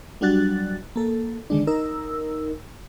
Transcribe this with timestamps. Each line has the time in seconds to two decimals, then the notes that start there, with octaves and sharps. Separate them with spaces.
0.21 F#3 G3 D4 F#4 F#6 A6
0.96 A#3 A4
1.50 D3 D#3 G#3 D4
1.67 D#4 A#4 E6